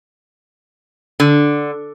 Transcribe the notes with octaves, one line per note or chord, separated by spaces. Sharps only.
D3